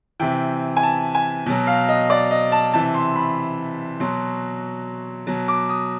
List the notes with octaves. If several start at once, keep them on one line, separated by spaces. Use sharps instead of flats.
C3 E3 G5
G#5
A5
G#5
B2 F#3
F5
D#5
D5
D#5
A5
C3 E3 A5
C6
B5
B2 F#3 C6
B2 F#3
D6
D#6